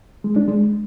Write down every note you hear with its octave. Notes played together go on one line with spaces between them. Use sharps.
G#3
D4
G#3